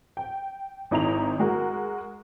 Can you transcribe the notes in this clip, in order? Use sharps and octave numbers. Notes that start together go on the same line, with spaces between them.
G5
G#1 D#4 E4 A#5 F7
G#3 F#4 A#4